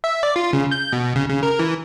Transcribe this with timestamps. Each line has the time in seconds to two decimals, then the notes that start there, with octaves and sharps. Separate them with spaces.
0.04 E5
0.23 D5
0.36 F4
0.53 C#3
0.71 G6
0.92 B2
1.16 C#3
1.29 C#3
1.43 A#4
1.59 E3